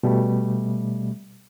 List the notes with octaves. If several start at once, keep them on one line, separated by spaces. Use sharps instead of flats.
B2 G3 A3